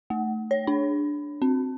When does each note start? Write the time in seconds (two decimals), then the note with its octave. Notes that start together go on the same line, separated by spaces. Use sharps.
0.10 A3
0.51 C#5
0.67 D4
1.42 C4